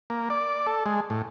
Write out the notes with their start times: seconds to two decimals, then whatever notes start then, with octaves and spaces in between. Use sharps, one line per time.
0.10 A#3
0.30 D5
0.67 A4
0.86 G#3
1.10 A2